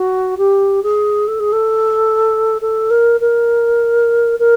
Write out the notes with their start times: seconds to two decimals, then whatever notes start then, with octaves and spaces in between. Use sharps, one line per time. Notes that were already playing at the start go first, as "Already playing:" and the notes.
Already playing: F#4
0.38 G4
0.83 G#4
1.28 A4
1.40 G#4
1.52 A4
2.61 A4
2.90 A#4
3.20 A#4
4.39 A#4